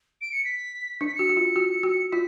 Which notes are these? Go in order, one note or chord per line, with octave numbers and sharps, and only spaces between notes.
D7
C#7
B6
D4 C#7
B6
F#4 C#7
F#4
F4
F#4
F#4
F4 B6